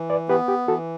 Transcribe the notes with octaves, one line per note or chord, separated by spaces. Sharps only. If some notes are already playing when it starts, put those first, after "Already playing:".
Already playing: E3
B4 D5
B3 G4 B4
G4
E3 F#4 A4